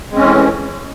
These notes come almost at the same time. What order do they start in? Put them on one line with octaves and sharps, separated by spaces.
G#3 C4 C#4 E3 A2